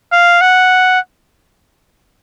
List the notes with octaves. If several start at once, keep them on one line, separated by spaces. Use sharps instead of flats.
F5
F#5